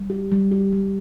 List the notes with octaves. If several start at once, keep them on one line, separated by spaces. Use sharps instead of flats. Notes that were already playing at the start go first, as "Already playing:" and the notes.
Already playing: G3
G4
G3
G4
G3